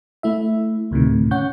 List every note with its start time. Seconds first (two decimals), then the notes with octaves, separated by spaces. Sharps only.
0.23 A3 E4 E5
0.91 D2 A2 C3 D#3
1.31 C#4 F#5 C#6 G6